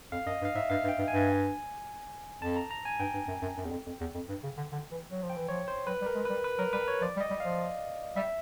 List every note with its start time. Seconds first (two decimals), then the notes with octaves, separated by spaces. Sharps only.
0.12 F2 F5
0.26 F#2 D#5
0.41 G2
0.45 F5
0.55 G#2 E5
0.70 G2 F5
0.84 G2
0.88 G5
0.99 G2
1.08 G#5
1.13 G2
2.42 F2 A5
2.56 A#5
2.71 A#5
2.85 G#5
3.00 G2 G5
3.14 G2
3.28 F#2
3.42 F#2
3.57 F#2
3.65 E2
3.71 F2
3.86 F2
4.01 E2
4.15 F2
4.29 G2
4.43 C#3
4.57 D3
4.72 D3
4.91 E3
5.11 F#3
5.23 F3
5.30 G5
5.36 E3
5.48 F3 C#5
5.68 C5
5.87 F#3 B4
6.01 G3
6.06 A#4
6.15 G#3
6.25 G3 B4
6.44 B4
6.59 F#3 A#4
6.73 G3 B4
6.88 C#5
7.01 F3 D5
7.16 G3
7.20 D#5
7.30 G3
7.40 F3 F5
8.16 G3 E5